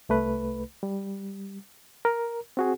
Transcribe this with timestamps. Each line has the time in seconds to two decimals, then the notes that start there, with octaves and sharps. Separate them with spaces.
0.09 C2 A3 B4
0.83 G3
2.05 A#4
2.57 C4 F#4 G#4